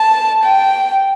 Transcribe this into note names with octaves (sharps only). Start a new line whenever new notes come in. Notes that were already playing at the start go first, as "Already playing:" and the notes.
Already playing: A5
G5